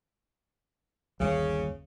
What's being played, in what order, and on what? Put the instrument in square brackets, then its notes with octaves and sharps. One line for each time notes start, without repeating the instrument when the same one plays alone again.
[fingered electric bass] G1 D#2 G3 [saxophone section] C#3